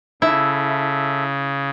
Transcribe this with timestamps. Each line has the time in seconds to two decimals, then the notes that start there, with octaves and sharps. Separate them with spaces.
0.22 C#3 E4 A4 E5